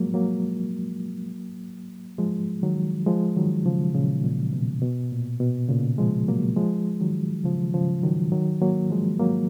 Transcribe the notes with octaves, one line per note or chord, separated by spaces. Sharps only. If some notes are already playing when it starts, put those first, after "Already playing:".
Already playing: F3 F#3 G#3 A#3
F#3 A#3
F3 G#3
D#3 F#3
F3 G#3
D#3 F#3
C#3 F3
A#2 C#3
A#2
B2
B2
A#2
B2
A#2 C#3
F3 G#3
F#3 A#3
F3 G#3
D#3 F#3
C#3 F3
C#3 F3
D#3 F#3
D#3 F#3
F#3 A#3
F3 G#3
F#3 A#3